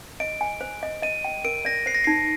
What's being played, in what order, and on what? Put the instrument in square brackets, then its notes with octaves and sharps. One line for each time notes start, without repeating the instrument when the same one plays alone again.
[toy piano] D#5 [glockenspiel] D7
[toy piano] G#5
C5
D#5
[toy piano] D#5 [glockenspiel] D#7
[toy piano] G5
[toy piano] A#4 [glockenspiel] D7
[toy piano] D5 [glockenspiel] A#6
[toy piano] C5 [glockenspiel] C7
[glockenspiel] A#6
[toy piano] D#4 [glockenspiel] C7